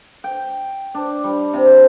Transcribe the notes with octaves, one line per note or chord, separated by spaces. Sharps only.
G5
D4
G3
C3